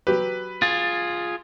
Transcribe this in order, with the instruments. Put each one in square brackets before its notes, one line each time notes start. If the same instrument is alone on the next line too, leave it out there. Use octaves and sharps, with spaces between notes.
[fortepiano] F#3 G4 [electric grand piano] B4
[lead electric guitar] F4 G#4 [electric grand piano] A6